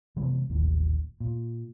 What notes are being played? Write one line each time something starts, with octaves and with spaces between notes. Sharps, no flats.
C3 E3 G#3 B3
D#1 A1 D#2
A#2